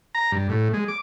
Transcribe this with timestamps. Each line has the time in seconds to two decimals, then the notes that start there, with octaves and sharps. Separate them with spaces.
0.15 A#5
0.32 G2
0.49 A2
0.73 G#3
0.88 D6